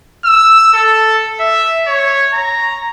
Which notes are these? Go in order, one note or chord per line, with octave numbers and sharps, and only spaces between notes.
E6
A4
E5
C#5
A#5